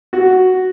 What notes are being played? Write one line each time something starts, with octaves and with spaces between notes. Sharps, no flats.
F#4